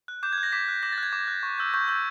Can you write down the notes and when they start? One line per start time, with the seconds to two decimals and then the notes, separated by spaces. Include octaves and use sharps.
0.08 F#6
0.23 D6 G6
0.33 G#6
0.38 F#6
0.43 A#6
0.52 D6 B6
0.68 F#6
0.83 D6 A#6
0.92 A6
0.98 F#6
1.03 G#6
1.13 D6
1.28 F#6
1.43 C#6
1.58 E6 G6
1.74 C#6 G6
1.88 E6 G6